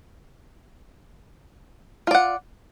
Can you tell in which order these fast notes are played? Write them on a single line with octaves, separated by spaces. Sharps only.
F4 D5 F#5